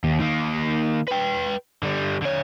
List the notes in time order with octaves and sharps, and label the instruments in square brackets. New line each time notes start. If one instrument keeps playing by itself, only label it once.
[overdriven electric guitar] D#2
D#3 A#3
B4 G5
D3 G3
D3 C#5